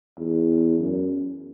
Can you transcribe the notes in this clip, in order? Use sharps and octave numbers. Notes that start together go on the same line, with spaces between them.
E2
F#2